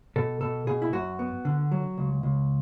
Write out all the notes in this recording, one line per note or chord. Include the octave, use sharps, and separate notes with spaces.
B2 A4
B2 A4
B2 G#4
E4
F#2 F#4
B3
D3
F#3
C#2
C#2